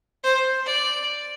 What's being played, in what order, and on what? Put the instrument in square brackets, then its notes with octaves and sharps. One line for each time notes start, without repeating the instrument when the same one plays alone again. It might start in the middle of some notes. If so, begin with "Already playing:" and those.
[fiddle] C5
D5